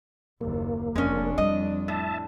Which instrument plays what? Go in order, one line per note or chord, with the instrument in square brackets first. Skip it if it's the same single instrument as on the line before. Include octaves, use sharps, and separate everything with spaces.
[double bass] F#1 D#2 [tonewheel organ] A#3
[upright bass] F1 [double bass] F2 D4 [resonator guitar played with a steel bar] G#3 C#4
[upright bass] G3 E4 [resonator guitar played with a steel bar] D#5
[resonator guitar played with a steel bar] A2 [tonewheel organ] E5 A5